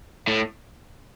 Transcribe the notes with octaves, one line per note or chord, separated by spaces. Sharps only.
A2